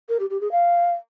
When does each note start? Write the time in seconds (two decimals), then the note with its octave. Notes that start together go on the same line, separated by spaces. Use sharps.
0.09 A#4
0.20 G4
0.30 G4
0.41 G#4
0.52 F5